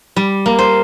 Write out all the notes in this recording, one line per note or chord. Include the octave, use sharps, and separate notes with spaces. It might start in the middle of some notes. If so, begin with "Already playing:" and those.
G3
A#3
C5